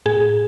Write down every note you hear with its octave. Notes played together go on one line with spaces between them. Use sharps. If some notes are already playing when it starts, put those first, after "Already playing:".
A2 G#4